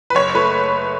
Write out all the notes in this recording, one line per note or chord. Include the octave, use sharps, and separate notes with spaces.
B4
F#1 C#5
A3 B4